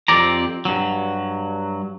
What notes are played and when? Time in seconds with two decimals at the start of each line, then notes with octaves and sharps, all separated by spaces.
0.08 F2 C4 G4 D5 A#5
0.65 G2 F#3